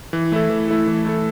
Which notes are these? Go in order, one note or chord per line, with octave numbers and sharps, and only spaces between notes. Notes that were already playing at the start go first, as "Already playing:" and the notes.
E3
A3 E4 A4
E3
A3 E4 A4
E3
A3 E4 A4